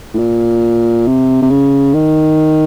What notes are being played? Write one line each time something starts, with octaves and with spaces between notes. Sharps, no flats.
A2
A#2
C3
C3
C#3
D#3